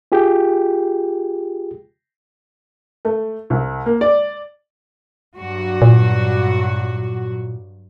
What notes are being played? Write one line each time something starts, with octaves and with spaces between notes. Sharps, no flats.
F4 G4 G#4 G5
A3
C2
A#3
D5
G2 F#3 F#4
A#2